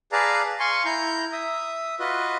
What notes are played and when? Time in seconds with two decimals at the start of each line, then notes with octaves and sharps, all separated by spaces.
0.12 G#4 B4 D5 F5 A5 A#5
0.60 F5 G#5 C6 C#6
0.85 E4 A#5 G6
1.32 E5 D#6
2.00 F4 F#4 B4 D#5